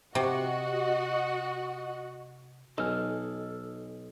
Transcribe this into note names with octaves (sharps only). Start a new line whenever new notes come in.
C3 F#4 D#5 F#5
B1 D#4 G#4 A4 F6